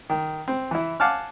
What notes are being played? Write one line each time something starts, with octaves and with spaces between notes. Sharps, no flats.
D#3
C4
E3 E4
F5 F#5 G#5 A5 D6 F6